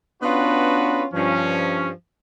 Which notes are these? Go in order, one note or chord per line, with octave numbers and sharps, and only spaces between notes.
B3 C#4 D4 F4 F#4 B4
G2 F3 C#4